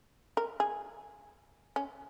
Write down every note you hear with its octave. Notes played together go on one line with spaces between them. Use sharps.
A#4
G#4
C#4